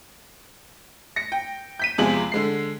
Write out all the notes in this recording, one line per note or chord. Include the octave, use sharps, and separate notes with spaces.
A#6 C#7
G5
G6 B6 D#7
E2 C3 F3 G#3 G#4 F#7
D3 G#3 C7